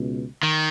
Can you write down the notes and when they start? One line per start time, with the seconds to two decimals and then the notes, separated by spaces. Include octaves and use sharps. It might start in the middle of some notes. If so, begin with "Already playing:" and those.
Already playing: C#2 B2
0.43 D#3